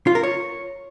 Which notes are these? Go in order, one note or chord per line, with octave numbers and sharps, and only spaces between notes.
F4
A#4
C#5